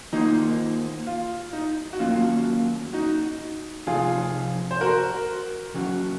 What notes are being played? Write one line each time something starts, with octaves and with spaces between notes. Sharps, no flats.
D#3 A#3 D#4 F4 C5
F4
D#4
F#4
D#3 F#3 A#3 C#4 F4
D#4 F#4
C3 F3 C4 D#4 F4 G#4
C5
F#4 A#4
C#3 F#3 C#4 F#4